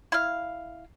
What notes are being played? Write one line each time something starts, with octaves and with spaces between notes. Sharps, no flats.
E4 F5